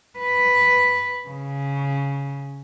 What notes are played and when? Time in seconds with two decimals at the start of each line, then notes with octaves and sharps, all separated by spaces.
0.19 B4
1.28 C#3